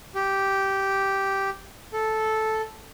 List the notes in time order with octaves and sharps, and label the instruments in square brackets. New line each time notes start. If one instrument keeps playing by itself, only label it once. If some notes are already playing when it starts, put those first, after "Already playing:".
[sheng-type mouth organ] G4
A4